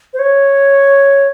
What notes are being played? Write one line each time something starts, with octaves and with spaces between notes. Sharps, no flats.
C5
C#5